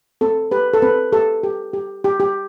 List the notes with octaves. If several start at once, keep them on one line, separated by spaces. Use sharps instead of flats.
C4 A4
G4 B4
A4
C4 B4
G4 A4
G4
G4
G4
G4